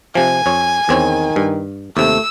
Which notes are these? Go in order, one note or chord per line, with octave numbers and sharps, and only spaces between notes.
C3 F3 G#5
F2 C#5
E2 D#3 C4 C#5
G2
D#2 C3 A3 E6